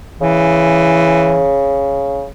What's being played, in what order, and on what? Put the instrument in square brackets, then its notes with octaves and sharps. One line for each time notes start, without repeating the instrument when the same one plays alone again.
[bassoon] C#3 [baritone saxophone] E3